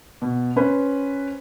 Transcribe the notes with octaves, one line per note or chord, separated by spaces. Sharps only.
B2
C#4 B4 C5